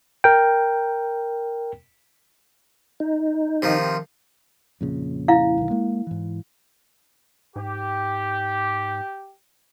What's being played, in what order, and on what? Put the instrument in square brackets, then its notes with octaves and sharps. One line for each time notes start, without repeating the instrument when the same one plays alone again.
[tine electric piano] A#4 G5
[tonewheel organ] D#4
[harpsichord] C3 D#3 F3
[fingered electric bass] F2 A#2 C#3
[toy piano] E4 F5
[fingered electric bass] B1 D#3
G#3 A#3
G#2 E3
[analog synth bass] G#2 [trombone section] G4